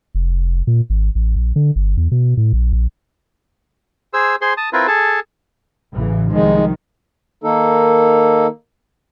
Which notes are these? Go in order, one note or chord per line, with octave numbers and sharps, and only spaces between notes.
F1
A#2
G#1
A1
A#1
D3
G1
E2
B2
A2
A#1
A#1
G#4 C5 E6
G#4 C5 C6
A5 D#6
C4 E4 F4 A#4 B4
G#4 A4 A5
A1 C#3 E3
C2 D#3 F3 G#3
D#3 A#3 D#4 A4